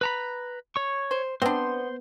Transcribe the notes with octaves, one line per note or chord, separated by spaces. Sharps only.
B4 A#5 B5
C#5 C#6
C5
B3 C4 D4 C5 C6